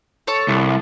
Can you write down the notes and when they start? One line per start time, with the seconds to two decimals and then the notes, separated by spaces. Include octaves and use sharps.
0.27 A4 C#5
0.48 C2